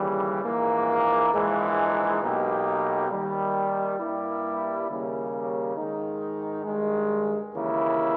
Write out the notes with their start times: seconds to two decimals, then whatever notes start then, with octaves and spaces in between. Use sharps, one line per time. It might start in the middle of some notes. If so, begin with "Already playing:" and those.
Already playing: D#2 C#3 E3 G3
0.43 A#1 G#2 E3 A#3
1.32 A#1 G#2 E3 G#3
2.21 B1 B2 A#3 D#4 G4
3.10 D#2 D#3 G3
3.99 G2 G3 A#3 E4
4.87 D#2 C#3 G3 A#3 C#4
5.76 G#2 D#3 G#3 D#4
6.65 G2 D#3 G#3
7.54 D#2 C#3 E3 A#3 E4